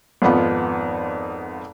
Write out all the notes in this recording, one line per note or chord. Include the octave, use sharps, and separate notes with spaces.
G#1 F2 B3 F4 F#5 B5